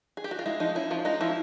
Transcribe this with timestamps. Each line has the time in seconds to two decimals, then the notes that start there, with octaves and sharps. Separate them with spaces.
0.17 G#4
0.24 G4
0.31 F#4
0.39 F4
0.46 G#3 E4
0.60 F3 D#4
0.75 C#4 E4
0.90 F3 F4
1.05 G#3 D#4
1.21 F3 E4